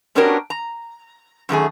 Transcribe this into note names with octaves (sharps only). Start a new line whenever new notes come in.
B3 C#4 D4 F#4 G4 A#4
A#5
F#2 D#3 A3 G#4